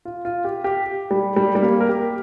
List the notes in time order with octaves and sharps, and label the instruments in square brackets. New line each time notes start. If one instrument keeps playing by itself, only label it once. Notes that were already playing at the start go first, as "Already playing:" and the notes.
[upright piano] F4
F4
G4
G4
G3
G3
G3
A#3
A#4
G4